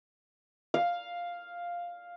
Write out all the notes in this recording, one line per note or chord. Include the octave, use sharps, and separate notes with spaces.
F5